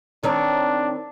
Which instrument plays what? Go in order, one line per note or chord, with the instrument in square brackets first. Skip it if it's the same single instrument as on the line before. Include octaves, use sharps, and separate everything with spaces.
[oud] D#3 C4 C#5 [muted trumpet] D4